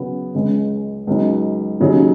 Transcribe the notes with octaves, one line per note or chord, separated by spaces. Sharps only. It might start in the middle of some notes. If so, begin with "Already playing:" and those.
Already playing: C#3 F#3 B3
C#2 C#3 G#3
C#2 C#3 F#3 D#4
D#2 C#3 F#3 D#4